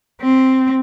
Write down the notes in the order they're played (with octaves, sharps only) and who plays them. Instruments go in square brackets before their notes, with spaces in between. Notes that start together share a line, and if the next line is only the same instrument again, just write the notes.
[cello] C4